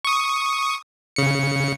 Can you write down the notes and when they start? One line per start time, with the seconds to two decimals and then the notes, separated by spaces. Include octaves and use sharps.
0.05 C#6 D#6
1.16 C#3 C#7